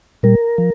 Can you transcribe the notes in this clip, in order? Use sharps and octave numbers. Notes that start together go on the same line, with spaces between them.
A#2 G3 A#4
F3